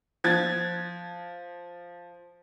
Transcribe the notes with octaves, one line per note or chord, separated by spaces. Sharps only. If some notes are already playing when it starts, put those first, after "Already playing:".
F3 G#6 A6